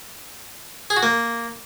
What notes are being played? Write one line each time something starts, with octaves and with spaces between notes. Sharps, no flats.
G#4
F#4
A#3